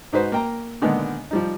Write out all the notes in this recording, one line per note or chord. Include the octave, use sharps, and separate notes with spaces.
G#2 D#4 F#4 B4 C5
A#3 G5 A#5
A#2 D3 D#3 G#3 B3
F3 G3 D#4